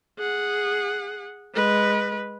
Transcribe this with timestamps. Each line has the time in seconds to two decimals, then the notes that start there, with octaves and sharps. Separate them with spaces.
0.18 G#4 F#5
1.54 G#3 B4